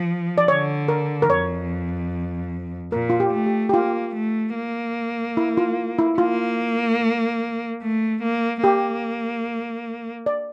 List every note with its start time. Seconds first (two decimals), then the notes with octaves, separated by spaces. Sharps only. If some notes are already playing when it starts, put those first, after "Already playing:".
Already playing: F3
0.38 D5
0.48 D3 C#5
0.88 A#4
1.22 A#4
1.30 F2 C#5
2.92 A#2 A#4
3.10 F4
3.20 G4
3.33 A3
3.46 G4
3.69 G4
3.74 A#3 F4
4.15 A3
4.55 A#3
5.37 E4
5.57 F4
5.98 E4
6.18 A#3 F4
7.82 A3
8.22 A#3
8.64 A#3 G4
10.26 D5